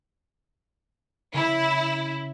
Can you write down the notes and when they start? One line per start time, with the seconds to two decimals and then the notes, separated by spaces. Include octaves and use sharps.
1.34 C#3 E4